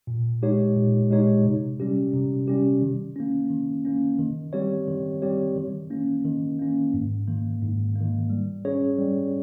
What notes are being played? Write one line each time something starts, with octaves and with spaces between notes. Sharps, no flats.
A#2
G#3 D#4 G4 C#5
A#2
G#3 D#4 G4 C#5
C3
G3 C#4 G4
C3
G3 C#4 G4
D#3
A#3 C#4
D#3
A#3 C#4
D#3
G3 C4 G4 C#5
D#3
G3 C4 G4 C#5
D#3
A#3 C#4
D#3
A#3 C#4
G#2
D#3 A#3
G#2
D#3 A#3
G3
C#4 G#4 C#5
G3